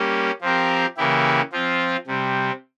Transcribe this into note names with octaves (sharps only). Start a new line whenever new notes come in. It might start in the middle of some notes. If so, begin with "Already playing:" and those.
Already playing: G3 A#3 C#4 G4
F3 C4 G4 A#4
C#3 E3 A#3 E4 G4
F3 C4 F4
C3 G3 C4